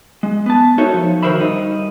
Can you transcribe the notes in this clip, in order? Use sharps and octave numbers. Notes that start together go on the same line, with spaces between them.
G#3
B3 A5
D#4 F#4 A4 A#4 C#5 E5
F3
D#3 F#4 A#4 C5 E5 B5
G2 D#4